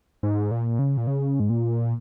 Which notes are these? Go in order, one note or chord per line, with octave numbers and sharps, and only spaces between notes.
G#2
A#2
C#3
A#2
C#3
G#2
A#2